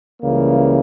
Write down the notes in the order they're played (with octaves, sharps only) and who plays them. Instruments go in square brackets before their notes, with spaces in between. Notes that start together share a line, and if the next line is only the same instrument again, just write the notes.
[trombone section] C#2 C#3 E3 G3 A#3